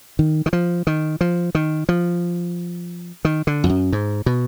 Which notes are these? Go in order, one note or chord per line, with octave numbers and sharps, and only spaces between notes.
D#3
D#3
F3
D#3
F3
D#3
F3
D#3
D3
F2
F#2
G#2
B2